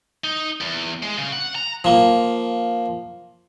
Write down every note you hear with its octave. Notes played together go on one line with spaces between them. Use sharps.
D#4
E2
G#3
C#3
F#5
A#5
F3 A#3